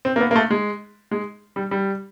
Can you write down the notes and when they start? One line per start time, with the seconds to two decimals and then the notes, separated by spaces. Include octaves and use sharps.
0.05 C4
0.16 A#3
0.21 B3
0.31 A#3
0.36 A3
0.50 G#3
1.11 G#3
1.56 G3
1.71 G3